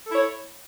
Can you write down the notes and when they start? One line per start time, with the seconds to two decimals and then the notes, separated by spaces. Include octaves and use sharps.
0.05 A4
0.10 E4
0.14 C#5